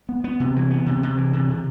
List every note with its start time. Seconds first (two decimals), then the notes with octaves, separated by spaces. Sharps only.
0.09 B3
0.24 B3
0.40 C3
0.56 E3
0.71 B3
0.86 C3
1.03 C3
1.17 E3
1.33 C3
1.49 C3